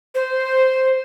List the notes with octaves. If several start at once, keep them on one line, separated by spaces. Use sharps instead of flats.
C5